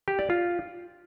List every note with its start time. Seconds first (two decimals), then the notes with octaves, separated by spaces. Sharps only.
0.08 G4
0.19 D5
0.30 F4